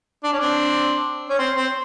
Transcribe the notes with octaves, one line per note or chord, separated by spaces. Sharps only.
D4
C#4
C4 D4
C#4
C4
C4